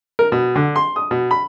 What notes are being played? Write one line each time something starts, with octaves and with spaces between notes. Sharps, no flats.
A#4
B2
D3
C6
D#6
B2
B5